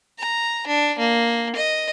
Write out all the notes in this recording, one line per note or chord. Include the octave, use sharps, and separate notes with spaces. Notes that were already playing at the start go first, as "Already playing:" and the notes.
A#5
D4
A#3
D#5